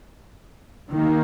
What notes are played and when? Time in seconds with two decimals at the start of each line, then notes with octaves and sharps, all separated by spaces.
0.90 D#3 A#3